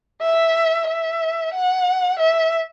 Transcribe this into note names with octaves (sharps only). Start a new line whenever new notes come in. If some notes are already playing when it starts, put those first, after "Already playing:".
E5
E5
F#5
E5